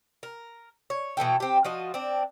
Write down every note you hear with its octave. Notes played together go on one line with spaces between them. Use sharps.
A#4
C#5
B2 E3 A4 G5
C4 G4
F3 F4 F#4 D#5
C4 D4